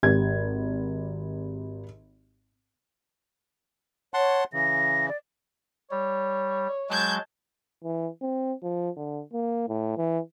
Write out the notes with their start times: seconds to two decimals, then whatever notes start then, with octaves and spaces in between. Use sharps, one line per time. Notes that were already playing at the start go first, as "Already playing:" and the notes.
0.03 G#1 G4 G#6
4.14 C#5 F#5 A5 C6
4.53 C#3 E3 A#6
5.08 D5
5.91 G3 C#5
6.90 F#3 G#3 A5 G6 G#6
7.83 E3
8.22 C4
8.63 F3
8.96 D3
9.33 A#3
9.68 A2
9.97 E3